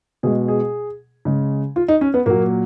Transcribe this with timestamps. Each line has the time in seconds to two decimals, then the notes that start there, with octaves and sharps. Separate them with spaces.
0.23 B2 G#3 G#4
0.48 G#4
1.25 C#3 G#3
1.76 F4
1.88 D#4
2.01 C#4
2.14 B3
2.26 A#2 F#3 A#3